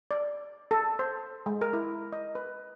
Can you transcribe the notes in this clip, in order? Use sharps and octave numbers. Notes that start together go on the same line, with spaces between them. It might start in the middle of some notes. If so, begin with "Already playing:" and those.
D5
A4
C5
G#3
A#4
E4
D#5
B4